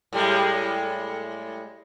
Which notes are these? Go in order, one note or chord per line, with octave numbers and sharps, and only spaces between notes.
A2 G3 G#3